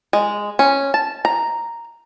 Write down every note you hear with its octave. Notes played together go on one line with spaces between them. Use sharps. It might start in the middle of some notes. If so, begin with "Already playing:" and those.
G#3
C#4
A5
A#5